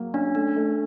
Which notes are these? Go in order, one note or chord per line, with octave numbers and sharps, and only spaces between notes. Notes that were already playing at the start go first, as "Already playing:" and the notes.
Already playing: F#3 A#3
C#4 D4
A3 D4
A3